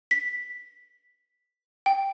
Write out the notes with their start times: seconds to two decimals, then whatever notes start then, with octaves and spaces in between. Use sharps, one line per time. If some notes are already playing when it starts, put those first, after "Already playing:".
0.11 B6
1.86 G5